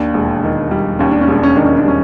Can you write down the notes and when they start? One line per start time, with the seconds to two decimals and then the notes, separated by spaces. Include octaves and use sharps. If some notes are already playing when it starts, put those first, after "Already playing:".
Already playing: D#2 D4
0.14 E1
0.44 D#3
0.71 G3
0.99 D#2 C#4
1.11 D4
1.21 C#4
1.28 E1 D4
1.43 C#4
1.55 D#3 D4
1.65 C#4
1.77 D4
1.85 G3 C#4